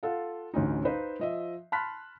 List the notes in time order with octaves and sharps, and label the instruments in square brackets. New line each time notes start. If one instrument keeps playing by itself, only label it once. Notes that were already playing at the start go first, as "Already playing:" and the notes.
[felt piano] F4 A4 F5 F#5
A1 D2 C#4 D#4
D#4 B4 C5 F5
F3 D#5 E5
A5 B5 C6 F6 F#6 B6